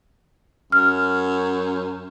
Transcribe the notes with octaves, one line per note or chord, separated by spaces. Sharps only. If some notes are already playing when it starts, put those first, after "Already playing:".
F#2 F6